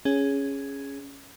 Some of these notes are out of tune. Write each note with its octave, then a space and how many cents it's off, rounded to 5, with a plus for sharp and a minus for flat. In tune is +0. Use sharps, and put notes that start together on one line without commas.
C#4 +0 G#4 +0